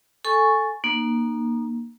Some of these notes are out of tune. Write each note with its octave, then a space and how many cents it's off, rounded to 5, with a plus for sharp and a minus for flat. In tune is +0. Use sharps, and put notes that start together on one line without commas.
A4 +0 G#5 +0 C#6 +0
A#3 +15 D#4 -35